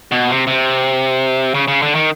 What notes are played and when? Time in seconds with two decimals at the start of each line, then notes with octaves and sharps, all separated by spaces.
0.12 B2
0.30 C3
0.47 C3
1.55 C#3
1.68 C#3
1.82 D3
1.95 D#3